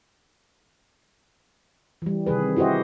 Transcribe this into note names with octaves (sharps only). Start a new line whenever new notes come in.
E3 G3
C3 D#3 G#4 B4
E4 F#4 G4 C5 D#5